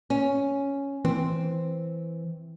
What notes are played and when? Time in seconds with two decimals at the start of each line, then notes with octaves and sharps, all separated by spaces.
0.10 C#4
1.05 E3 C4